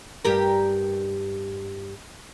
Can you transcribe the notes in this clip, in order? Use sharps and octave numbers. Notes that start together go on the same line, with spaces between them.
G2 G4 A#4